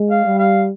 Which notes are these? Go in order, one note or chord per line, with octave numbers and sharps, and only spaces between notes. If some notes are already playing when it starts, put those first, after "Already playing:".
Already playing: G#3
F5
G3
F5